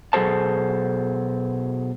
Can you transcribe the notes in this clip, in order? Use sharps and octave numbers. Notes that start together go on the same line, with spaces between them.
B2 F#3 G#4 A4 C5 A5